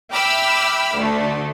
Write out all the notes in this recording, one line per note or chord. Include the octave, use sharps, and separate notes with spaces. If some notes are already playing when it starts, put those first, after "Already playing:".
E5 G5 B5 D6 E6 F6
D2 D3 A3